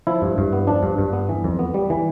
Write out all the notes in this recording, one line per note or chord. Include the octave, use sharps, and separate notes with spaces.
F3 E4
G2
G2
B3
F3 D4
G2
G2
B3
E3
F2
B3
G3
E3